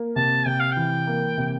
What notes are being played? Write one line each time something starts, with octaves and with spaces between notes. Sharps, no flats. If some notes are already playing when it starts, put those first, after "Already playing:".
Already playing: A#3
C3 A5
C3 G5
F5
G5
E3
A#3
C3